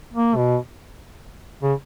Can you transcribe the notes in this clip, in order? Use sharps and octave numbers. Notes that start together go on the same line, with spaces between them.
A#3
B2
C#3